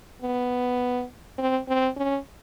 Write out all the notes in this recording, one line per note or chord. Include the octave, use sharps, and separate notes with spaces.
B3
C4
C4
C#4